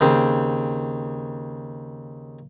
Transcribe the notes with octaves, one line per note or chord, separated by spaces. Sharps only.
D#2 C#3 C4